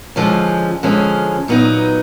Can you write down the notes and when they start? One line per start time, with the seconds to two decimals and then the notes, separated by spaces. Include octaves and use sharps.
0.16 D3 F3 G#3 C#4
0.83 D3 F3 G#3 C#4
1.48 A#2 F#3 B3 D#4